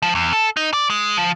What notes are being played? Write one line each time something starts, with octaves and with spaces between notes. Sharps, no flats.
F3
E2
A4
D#4
D5
G#3
F3